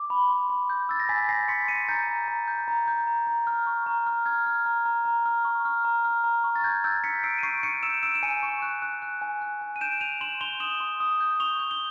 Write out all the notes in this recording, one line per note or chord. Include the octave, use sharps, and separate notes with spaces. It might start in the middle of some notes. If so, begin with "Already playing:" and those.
Already playing: D6
B5
C6
C6
G6
E6 A6
A#6
G#5 A6 B6
G#5 A#6 C7
C6 B6 C#7
C6 C#7 D#7
A#5 G6 A6
A#5
A#5
G6
A#5
G6
A#5
A#5
F6
C#6
A#5
F6
F6 G#6
F6
A#5
A#5
A#5
F6
C#6
F6
A#5
F6
A#5
C#6
A6
G6 G#6
E6 G6 A6
G6 B6 C#7
E6 C7 D7
D#7
C#6 C7 D7
G6 C#7 D#7
E6 D7 E7
E6 D7 E7
E7
G#5 C#7 D#7
C#6
F#6
F#6
F#6
G#5
F#6
G#5
D#7
G6 D7 E7
G6 D#7 F7
C6 E7 F#7
C6 F7 G7
D#6 E7 F#7
C6
D#6
G6
C#6 F7 G7
G6
G7